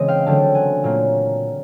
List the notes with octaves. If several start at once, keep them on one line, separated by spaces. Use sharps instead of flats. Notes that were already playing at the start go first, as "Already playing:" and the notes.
Already playing: C#3 E3 G#3 C4 D#5
F5 G5
D3 F#3 A3 C4 G5 A5
F#5 G#5
A#2 F#3 A#3